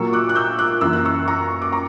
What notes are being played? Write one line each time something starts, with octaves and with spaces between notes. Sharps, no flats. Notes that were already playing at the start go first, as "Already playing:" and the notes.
Already playing: A#2 F#3 A#3 C#6 E6
D6 F#6
F#6
E6 G6
D6 F#6
F#2 E3 A#3 E6
F#6
C#6 E6
A#5 C#6
D6
A#5 C#6